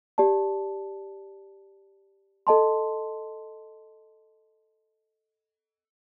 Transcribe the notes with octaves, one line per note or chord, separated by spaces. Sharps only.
G4 D5 A5
A4 D#5 A5 C6